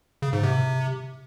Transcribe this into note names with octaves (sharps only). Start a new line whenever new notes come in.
C#3
G#2
C3